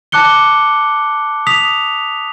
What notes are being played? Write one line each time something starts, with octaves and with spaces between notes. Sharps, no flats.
A5 D6 F#6 C#7 G7
D#6 B6 F7